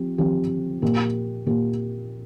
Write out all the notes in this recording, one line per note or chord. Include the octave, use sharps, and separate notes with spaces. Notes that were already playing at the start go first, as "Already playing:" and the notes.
Already playing: F3 C4 G4
F3 C4 G4
A#2 A#3 G4
A#2 A#3 G4